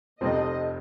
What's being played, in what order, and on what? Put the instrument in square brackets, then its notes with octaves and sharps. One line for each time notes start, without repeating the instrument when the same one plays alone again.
[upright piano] F1 F2 C3 F3 C4 [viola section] D#5